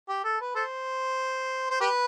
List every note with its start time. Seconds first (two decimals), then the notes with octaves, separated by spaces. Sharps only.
0.08 G4
0.24 A4
0.40 B4
0.55 A4 C5
1.70 C5
1.81 G4 B4